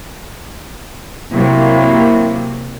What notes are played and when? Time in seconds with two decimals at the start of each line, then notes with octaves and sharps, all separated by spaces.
1.33 C3 F#3 A#3 E4